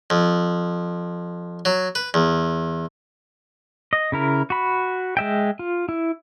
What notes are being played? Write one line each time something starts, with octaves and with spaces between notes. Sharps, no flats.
F2
F#3
B4
E2
D#5
C#3 E4 A#4
F#4 B5
G#3 E5 G5
F4
E4